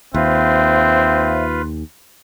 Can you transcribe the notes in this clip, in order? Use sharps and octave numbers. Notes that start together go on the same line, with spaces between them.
D#2 C4 F4 B4 C5 E5 F5